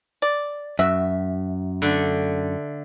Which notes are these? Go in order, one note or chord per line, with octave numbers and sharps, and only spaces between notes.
D5
F#2 F#4 E5
D3 A3